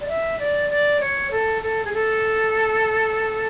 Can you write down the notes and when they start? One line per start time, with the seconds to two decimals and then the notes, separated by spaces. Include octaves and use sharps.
0.01 D5
0.09 E5
0.39 D5
0.70 D5
1.01 C#5
1.31 A4
1.62 A4
1.85 G#4
1.94 A4